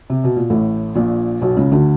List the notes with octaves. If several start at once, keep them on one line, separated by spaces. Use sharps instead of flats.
C3
B2
A#2
A1 A2
A#1 A#2
B1 B2
C#2 C#3
D2 D3